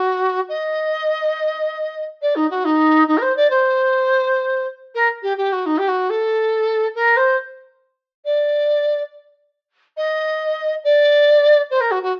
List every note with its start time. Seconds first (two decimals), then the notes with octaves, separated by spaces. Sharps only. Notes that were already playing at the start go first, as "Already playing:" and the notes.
Already playing: F#4
0.49 D#5
2.22 D5
2.36 D#4
2.50 F#4
2.65 D#4
3.08 D#4
3.17 A#4
3.22 C5
3.36 D5
3.50 C5
4.95 A#4
5.22 G4
5.37 G4
5.52 F#4
5.66 D#4
5.78 G4
5.88 F#4
6.10 A4
6.95 A#4
7.17 C5
8.25 D5
9.97 D#5
10.84 D5
11.71 C5
11.81 A#4
11.91 F#4
12.03 F#4